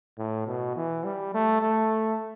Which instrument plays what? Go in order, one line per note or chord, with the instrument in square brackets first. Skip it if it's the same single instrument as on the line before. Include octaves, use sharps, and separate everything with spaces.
[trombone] A2
B2
E3
G3
A3
A3